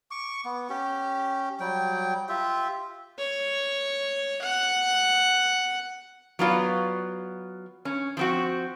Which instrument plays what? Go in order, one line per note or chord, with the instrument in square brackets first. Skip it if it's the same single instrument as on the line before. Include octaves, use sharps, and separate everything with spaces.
[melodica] C#6 D6
B3
C#4 G4
F#3 G3 G5
F4 G4 E5
[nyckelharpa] C#5
F#5
[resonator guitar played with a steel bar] F#3 B3 F4 D5
C#4
F3 C4 F#4